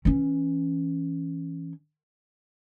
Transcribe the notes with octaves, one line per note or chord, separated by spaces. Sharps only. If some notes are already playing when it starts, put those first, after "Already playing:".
E3 C#4